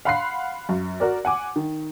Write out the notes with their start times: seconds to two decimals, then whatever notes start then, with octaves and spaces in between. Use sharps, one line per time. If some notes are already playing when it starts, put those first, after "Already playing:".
0.05 F5 F#5 B5 C6 F#6 C7
0.69 F#2
1.00 F#4 A#4 D5
1.25 F#5 G#5 D6
1.56 D#3